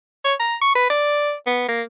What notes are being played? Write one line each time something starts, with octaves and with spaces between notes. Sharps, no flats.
C#5
A#5
C#6
B4
D5
B3
A#3